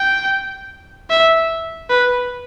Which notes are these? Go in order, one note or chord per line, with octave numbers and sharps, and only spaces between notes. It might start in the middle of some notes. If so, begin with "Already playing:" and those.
Already playing: G5
E5
B4